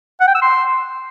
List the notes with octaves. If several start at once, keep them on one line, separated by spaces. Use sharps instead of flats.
F#5
G5
E6
C6